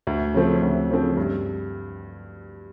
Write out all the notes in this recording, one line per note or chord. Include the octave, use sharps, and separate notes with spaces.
D2
C#3 F3 A3 C4
D2
C#3 F3 A3 C4
G2